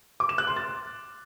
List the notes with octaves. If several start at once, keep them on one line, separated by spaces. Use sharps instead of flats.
D6
E7
F#6
C6
A6